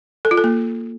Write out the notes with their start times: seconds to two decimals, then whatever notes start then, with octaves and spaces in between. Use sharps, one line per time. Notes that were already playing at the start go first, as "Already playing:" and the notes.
0.25 A4
0.31 F4
0.37 A4
0.44 A#3